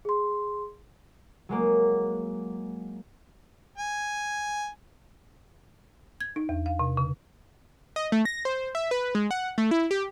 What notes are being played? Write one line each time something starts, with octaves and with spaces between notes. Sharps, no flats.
G#4 C6
F#3 G#3 A#3
G#5
G#6
D#4
E2
F5
C3
C#3
D#5
A3
A#6
C5
E5
B4
G#3
F#5
A3
E4
G4